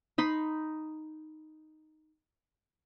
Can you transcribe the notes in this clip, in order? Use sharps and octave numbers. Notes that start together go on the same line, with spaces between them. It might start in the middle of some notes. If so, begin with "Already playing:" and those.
D#4 B5 C6